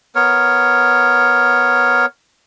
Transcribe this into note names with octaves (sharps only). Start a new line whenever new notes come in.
B3 A#4 C#5